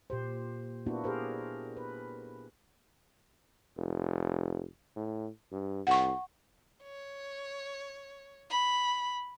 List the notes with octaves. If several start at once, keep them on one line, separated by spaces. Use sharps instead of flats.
A#2 G4 C5
A#3 B3 D4 E4 F#4
G4 G#4 A#4 C5
B4
F1
A2
G2
C2 F#5 C#6
C#5
B5